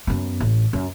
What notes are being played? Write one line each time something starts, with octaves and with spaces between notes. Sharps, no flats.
F#2 B3
A1
F#2